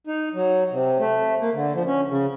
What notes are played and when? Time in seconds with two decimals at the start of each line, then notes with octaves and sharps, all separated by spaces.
0.07 D#4
0.34 F#3
0.71 C3
0.99 A3
1.40 A#3
1.53 D3
1.73 F3
1.86 C#4
2.09 C#3